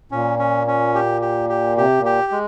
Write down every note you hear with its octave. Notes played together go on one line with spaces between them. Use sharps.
A#2 C#4
C#4
C#4
G4
G4
G4
C3 G4
A#2
G4
G#3